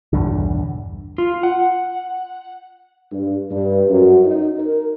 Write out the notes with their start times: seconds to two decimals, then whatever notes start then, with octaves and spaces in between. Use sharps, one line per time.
0.13 B1 E2 G2 D3
1.18 F4
1.43 F#5
3.12 G2
3.51 G2
3.90 F#2
4.25 D#4
4.59 A#4